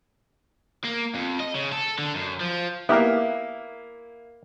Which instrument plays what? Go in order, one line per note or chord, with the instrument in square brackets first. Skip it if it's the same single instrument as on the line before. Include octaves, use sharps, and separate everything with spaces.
[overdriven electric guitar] A#3
F2
D#5
C#3
A4
D3
F#2
F3
[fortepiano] A#3 E4 [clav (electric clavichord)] B3 G4 A#4